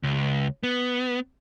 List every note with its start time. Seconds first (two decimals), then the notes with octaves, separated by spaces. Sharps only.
0.04 C#2
0.63 B3